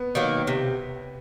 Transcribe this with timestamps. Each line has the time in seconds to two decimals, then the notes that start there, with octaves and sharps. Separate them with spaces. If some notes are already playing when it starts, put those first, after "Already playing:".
Already playing: B3
0.15 D#3 F#3 A#3
0.47 C3